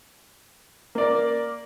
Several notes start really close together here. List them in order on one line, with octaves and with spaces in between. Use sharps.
A#3 D5 A#4